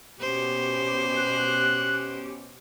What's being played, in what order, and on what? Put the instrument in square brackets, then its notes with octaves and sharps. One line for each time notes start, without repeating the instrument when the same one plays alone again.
[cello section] B2 C#4 G4 [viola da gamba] C5
[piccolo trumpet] F#6